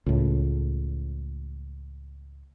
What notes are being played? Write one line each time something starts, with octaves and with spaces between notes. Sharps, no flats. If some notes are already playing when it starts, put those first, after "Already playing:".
C#2 A2